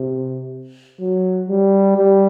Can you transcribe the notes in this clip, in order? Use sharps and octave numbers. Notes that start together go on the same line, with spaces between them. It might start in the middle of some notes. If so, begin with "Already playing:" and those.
Already playing: C3
F#3
G3
G3